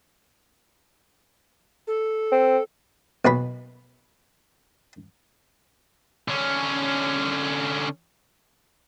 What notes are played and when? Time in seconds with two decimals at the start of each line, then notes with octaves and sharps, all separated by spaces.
1.87 A4
2.32 C4
3.25 B1 B2 B4 B5
6.28 D3 C#4